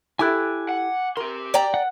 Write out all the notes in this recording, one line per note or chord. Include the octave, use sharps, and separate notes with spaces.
E4 G4 A4 G#5 D6 F#6
F#5
G4 A#4 C6
D5 G5 A#5
F#5